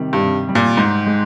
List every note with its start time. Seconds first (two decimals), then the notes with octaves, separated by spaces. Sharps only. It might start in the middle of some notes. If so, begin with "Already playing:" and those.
Already playing: C3 D#3 G3
0.13 G2
0.20 C3
0.49 G3
0.55 A#2
0.77 G#2 D#4
1.07 G#3